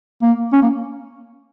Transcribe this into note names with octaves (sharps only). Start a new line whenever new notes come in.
A#3
C#4
A#3